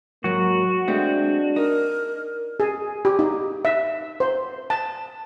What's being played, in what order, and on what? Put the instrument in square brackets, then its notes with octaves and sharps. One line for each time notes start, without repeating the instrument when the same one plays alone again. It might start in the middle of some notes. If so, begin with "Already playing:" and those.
[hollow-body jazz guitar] G#2 F#3 [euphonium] A#3 [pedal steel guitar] F#4
[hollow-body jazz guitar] G#3 A3 C4 [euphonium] D4
[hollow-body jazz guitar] D#4 [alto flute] A#4
[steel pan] G#4
G4
D#4
E5
C5
A5